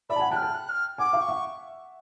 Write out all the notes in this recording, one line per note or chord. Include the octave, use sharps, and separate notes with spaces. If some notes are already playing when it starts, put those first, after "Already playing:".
D5 E5 B5
A5
F#5 G#5
G5 A5 F#6
F6
G5 A5
F#6
F6
F#5 G#5 D6
F5 G5
C#6
E5 F#5